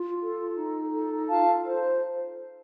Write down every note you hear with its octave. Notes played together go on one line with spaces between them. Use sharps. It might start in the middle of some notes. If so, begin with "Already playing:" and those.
Already playing: F4
A4
D#4
A4
F4 F5 A5
C5